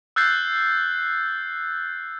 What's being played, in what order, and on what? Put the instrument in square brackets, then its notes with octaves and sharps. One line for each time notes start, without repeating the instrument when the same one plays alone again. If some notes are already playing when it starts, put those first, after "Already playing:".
[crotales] E6 F#6 G6 A6 C7